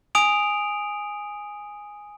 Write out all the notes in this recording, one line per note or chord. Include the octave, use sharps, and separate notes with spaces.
G#5 D#6 D7 F7